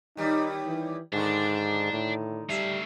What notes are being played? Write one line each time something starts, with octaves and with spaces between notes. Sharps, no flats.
D#2 G3 D#4
E3
G#2 D3 D#3 D5 A5
A2
G3 A3 E5 F5